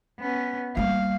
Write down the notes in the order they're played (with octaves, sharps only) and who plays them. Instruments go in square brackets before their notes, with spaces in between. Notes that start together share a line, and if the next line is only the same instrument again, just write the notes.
[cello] B3 C#4
[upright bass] G3 A#3 [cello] F5